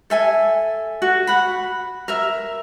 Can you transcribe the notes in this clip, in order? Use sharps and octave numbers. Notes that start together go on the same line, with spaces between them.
A4 E5 G#5
F#4
F#5 B5
A#4 E5